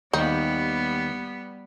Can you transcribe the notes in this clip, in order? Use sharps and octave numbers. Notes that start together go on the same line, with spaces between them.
D#2 G3 B3 D#4